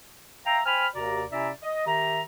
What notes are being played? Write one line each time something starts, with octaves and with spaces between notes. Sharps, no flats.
E5 F5 G5 A#5
C5 G5 G#5 B5 F6
D#2 C3 F#4 A#4 D5 A#5
C3 C#4 E4 D5 E5 A#5
D#5
D#3 G4 E5 A#5